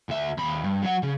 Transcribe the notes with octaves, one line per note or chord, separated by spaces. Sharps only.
D2 E5
D#2 B5
G2
F#3 F#5
C#3